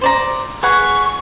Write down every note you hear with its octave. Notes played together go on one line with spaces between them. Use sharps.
C5 D5 A#5
G#4 B4 F#5 C#6